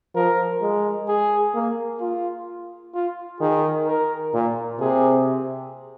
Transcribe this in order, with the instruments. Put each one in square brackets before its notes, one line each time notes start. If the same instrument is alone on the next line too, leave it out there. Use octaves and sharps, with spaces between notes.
[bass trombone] F3 [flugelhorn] A#4
[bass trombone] G#3
[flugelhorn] G#4
[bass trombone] A#3
[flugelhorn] F4
F4
[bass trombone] D#3 [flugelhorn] G#4
[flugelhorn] A#4
[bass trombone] A#2
[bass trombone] C3 [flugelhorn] G#4